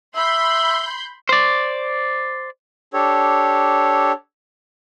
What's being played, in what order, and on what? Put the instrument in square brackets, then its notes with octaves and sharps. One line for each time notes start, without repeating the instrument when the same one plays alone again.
[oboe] E5 [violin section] B5 C6 G6
[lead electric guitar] C5 D5
[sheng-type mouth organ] D4 G4 A4 C#5